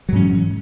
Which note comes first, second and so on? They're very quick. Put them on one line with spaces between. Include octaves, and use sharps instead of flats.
F#3 G#2 C#4 E3